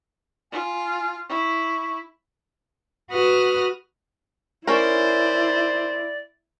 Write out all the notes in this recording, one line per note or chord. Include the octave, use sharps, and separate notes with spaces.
F4 G#5
E4 C#6
F#4 B4 D#6 F6 F#6
C#4 E4 A#4 C5 D5